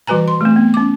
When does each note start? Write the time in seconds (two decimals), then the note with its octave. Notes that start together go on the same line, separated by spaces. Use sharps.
0.07 E3 G3 F#4 B4 G#5 A#5
0.28 C6
0.41 A3 C4
0.56 B3
0.74 C#4 D6